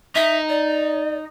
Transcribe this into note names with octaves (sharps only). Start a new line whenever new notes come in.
D#4 E5
D5